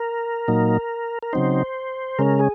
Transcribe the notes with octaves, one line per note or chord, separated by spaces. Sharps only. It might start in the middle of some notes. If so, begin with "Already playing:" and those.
Already playing: A#4
A#2 F#3 A#3 D#4
A#4
C#3 F#3 C4 D#4 C5
C#3 G#3 C#4 A#4
G#4